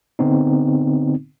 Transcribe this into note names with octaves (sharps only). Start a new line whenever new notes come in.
D3 B3 C4 D#4